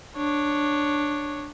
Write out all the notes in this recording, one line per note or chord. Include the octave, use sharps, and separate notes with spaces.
D4 C#5